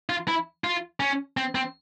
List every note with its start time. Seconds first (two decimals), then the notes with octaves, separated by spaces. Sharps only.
0.09 F4
0.28 E4
0.64 F4
1.00 C#4
1.37 C4
1.55 C4